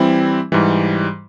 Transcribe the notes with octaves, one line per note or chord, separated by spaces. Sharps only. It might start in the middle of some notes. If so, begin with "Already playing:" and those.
Already playing: E3 G3 C4 E4
G#2 E3 G3